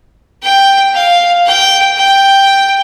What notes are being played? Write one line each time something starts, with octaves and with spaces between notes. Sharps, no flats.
G5
F5
G5
G5